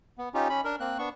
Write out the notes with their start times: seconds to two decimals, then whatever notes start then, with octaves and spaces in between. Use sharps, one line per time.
0.18 B3
0.34 C#4 D#4 F4 G4
0.49 C#4 B5
0.65 D4 A#4
0.80 A#3 C4 F#6
0.99 B3 D4 C#6